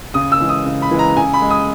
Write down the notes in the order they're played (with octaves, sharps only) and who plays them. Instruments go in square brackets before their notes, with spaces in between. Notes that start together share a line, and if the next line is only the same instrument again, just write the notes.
[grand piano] C#3 D#6
E6
E3 G#3
D#6
C#3
B5
E3 G#3
A#5
C#3 G#5
B5
G#3
D#6